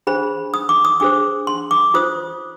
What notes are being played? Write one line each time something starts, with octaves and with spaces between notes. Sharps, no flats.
D4 G#4 C5 B5
D#6
D6
D#6
D4 G#4 C5 D6
C6
D6
F4 C5 D#6